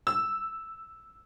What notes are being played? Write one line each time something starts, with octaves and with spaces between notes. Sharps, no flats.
E6